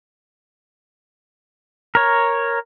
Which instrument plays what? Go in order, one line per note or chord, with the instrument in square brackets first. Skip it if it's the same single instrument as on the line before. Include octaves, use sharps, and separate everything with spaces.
[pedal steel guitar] A#4 C#5